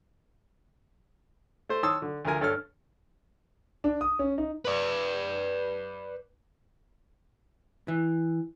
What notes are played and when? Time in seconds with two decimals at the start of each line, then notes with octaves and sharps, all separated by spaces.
1.69 A3 C5
1.83 D#3 C#5 A5 C6 D#6 E6
2.02 D3
2.25 D2 F3 A#4 G#5
2.41 G2 A4 C#5 F6
3.84 D4
4.01 D#6
4.19 C#4
4.38 D#4
4.65 B4 D5
7.88 E3